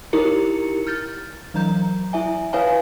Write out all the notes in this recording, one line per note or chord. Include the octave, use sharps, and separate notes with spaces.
D#4 E4 G4 A#4 A#5 C#7
F6 G6 A6
E3 F#3 A#5 G6
E4 E5 G#5
E4 B4 C#5 F5 G#5